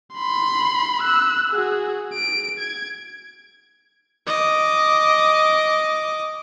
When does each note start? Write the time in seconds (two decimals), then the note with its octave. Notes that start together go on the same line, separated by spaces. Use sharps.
0.15 B5 C6
1.02 E6 F#6
1.52 F#4 G#4
2.14 D7
2.59 G#6
4.27 D#5 D6